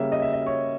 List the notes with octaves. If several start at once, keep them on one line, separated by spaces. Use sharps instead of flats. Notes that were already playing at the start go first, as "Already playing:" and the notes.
Already playing: C#3 G3 A#3 C#4 E5
D#5
E5
D#5
C#5